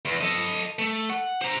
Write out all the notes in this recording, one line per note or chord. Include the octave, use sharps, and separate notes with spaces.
E2
A4 D#5
A3
F#5
C5 A#5